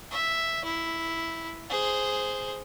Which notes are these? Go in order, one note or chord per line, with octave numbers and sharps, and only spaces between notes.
E5
E4
G#4 C5